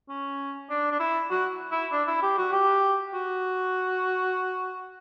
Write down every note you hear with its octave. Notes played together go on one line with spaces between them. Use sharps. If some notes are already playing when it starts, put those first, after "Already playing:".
C#4
D4
D4
E4
F#4
E4
D4
E4
G4
F#4
G4
F#4